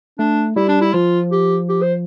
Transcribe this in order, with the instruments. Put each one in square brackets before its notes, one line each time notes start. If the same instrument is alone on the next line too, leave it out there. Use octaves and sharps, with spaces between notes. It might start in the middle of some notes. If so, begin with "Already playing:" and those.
[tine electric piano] A3 [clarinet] D4
[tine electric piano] G3 [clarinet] E4
[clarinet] D4
E4
[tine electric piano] F3 [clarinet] F4
[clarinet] G4
G4
C5